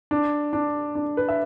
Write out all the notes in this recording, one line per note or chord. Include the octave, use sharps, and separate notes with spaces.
D4
D4
D4
B4
E5